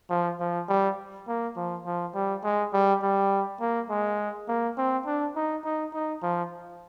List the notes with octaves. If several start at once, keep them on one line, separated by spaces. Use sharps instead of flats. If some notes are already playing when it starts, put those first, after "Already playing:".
F3
F3
G3
A#3
F3
F3
G3
G#3
G3
G3
A#3
G#3
A#3
C4
D4
D#4
D#4
D#4
F3